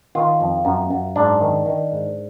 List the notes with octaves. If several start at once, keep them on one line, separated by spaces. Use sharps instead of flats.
D#3 F4
F2
F#2
F#2
G#2 D4
D#3
D#3
G#2